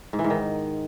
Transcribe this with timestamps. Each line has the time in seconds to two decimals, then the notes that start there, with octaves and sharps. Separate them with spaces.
0.13 G#2
0.19 E3
0.24 G#2
0.30 D#3